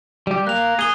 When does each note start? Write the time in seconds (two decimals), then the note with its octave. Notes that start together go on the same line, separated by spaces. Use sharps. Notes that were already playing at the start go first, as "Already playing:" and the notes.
0.27 G3 G4
0.47 A#3 F#6 F7
0.79 G#4 D#6 D#7 G7